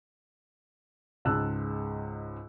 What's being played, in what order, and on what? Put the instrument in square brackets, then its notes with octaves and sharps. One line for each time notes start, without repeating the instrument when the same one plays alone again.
[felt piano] C#2 G#2 A5 E6 F#6